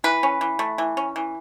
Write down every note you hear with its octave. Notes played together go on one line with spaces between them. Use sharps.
E3 B4
C#4
E3
A3
E3
C#4
E3